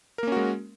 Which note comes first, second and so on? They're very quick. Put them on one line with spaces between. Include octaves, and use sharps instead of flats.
A#4 A#3 C#4 F#4 G#3